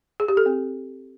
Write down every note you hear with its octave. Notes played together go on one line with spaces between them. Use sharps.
G#4
G4
A4
C4